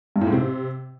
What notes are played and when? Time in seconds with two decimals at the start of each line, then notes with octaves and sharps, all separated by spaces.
0.16 G2
0.21 A2
0.27 G#2
0.32 C3